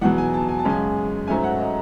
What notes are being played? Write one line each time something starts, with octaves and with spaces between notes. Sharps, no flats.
E2 B2 F#3 F#5
G#5
A5
G#5
A5
F#2 C#3 G#3 C#4 G#5
G#2 F#3 A3 C#4 G#5
F#5
D#5